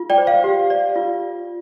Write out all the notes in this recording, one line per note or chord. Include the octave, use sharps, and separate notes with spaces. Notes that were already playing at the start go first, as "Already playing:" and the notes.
Already playing: F4
D5 G5
C5
F5
G4
D5
F4